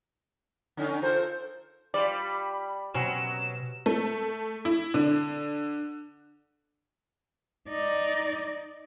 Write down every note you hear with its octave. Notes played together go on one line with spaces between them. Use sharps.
D3 C#4 D#4
F4 A4 A#4 C5
G3 F4 D5 B5
B2 F#3 C4 C#4 E7
A3
E4
D3
D#4 D5